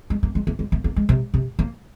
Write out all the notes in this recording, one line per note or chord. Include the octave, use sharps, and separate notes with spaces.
G#3
A#3
G#3
A#3
G#3
A#3
A#3
G#3
C3
C3
A#3